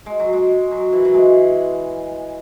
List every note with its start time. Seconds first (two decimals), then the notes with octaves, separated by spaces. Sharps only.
0.06 G#3
0.20 F#3
0.33 G#3
0.71 F#3
0.93 E3
1.05 F#3
1.14 G#3